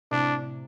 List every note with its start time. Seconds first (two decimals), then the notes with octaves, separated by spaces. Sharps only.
0.11 A2 C3 D4